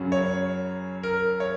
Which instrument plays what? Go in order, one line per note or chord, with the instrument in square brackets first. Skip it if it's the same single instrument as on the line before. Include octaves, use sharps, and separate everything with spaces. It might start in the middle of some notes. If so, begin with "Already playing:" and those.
Already playing: [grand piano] F#2 C#3 F#3 C#4
C#5
A#4
C#5